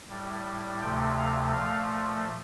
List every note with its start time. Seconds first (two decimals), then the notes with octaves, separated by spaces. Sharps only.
0.09 A2 G3
0.81 D2 C3 F3 A3 G5
1.17 F5
1.53 A#2 F3 A3 F5